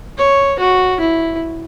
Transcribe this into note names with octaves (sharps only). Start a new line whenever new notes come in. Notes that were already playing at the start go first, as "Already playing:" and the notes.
C#5
F#4
E4